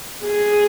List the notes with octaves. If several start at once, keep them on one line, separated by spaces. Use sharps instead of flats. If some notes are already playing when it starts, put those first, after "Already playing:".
G#4